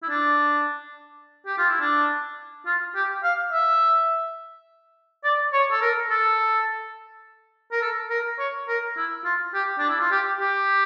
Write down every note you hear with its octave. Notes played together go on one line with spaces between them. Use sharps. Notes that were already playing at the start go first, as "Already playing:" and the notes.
E4
D4
G4
F4
E4
D4
F4
G4
F5
E5
D5
C#5
A4
A#4
A4
A#4
A4
A#4
C#5
A#4
E4
F4
G4
D4
E4
F4
G4
G4